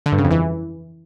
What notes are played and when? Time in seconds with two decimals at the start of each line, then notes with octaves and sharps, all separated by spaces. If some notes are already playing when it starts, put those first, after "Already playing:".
0.06 D3
0.12 G2
0.18 C#3
0.24 F2
0.31 E3